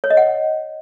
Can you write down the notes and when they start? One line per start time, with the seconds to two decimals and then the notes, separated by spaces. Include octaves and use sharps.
0.04 C#5
0.10 D#5
0.17 F#5